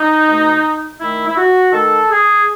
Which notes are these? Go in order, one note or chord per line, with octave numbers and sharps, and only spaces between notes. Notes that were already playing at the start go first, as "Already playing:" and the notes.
Already playing: D#4
B2 A3
D#3 A3 E4
E4
F#4
D#3 A3 A4
G#4